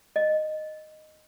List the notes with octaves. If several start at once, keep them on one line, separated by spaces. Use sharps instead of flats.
D#5